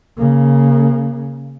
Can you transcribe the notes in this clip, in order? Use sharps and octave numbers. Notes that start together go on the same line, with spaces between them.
C#3 A#3